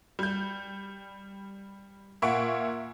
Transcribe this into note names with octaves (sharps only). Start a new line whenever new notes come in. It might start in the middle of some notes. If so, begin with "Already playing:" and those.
G3 G6
A#2 A#3 E5 F#5 C#6 D7